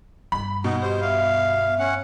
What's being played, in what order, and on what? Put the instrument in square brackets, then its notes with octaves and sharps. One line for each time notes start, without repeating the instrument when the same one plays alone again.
[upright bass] G2 [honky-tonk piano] B5
[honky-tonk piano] B2 [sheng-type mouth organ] D#4 [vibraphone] F#5
[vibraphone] G4 D#5 [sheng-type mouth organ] C5
[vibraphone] B3 E5 [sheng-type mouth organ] F5
[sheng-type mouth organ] C#4 F#5